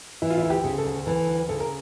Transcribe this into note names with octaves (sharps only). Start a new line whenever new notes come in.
E3 E4
F4
E4
D2
G4
C#3
A4
D2
E3 A4
D2
C#3 A4
A#4